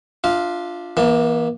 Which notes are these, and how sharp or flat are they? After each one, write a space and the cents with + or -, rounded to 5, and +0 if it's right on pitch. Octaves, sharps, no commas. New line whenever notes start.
D4 +5 F4 +0 E5 -30
E3 +0 A#3 +40 A5 +30